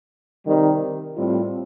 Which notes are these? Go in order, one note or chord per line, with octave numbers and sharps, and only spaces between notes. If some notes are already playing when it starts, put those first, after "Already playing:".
C3 D#3 G3
A2 G3 C4 F4